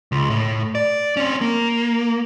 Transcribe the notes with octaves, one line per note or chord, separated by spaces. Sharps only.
C#2
A2
D5
C4 C#4
A#3